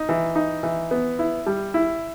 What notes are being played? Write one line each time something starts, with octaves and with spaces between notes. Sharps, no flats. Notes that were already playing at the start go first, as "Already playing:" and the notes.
Already playing: D#4
E3
D#4
E3
B3
E4
G3
E4